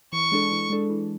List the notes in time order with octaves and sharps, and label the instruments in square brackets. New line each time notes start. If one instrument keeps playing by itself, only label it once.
[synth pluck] E3 [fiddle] C#6
[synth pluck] G#3 D4 A4
E3
G#3 D4 A4
E3